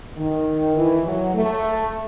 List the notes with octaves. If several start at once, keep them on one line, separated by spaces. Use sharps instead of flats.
D#3
E3
F#3
A3